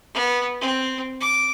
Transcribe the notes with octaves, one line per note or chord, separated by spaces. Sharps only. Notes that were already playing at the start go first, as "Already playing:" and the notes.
B3
C4
D6